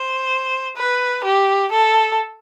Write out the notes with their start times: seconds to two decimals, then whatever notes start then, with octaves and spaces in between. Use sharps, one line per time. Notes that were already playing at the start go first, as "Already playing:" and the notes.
Already playing: C5
0.76 B4
1.24 G4
1.72 A4